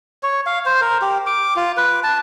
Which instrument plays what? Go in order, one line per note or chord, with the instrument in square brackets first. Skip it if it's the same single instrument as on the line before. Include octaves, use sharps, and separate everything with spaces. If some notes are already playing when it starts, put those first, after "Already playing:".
[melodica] C#5
F5
C5
A#4
G4
D6
F4
B4
A5